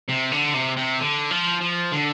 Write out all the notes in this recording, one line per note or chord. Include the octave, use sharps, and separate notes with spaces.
C3
D3
C3
C3
D3
F3
F3
D3